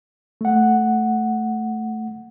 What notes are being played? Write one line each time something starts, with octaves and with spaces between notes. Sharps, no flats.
A3 F#5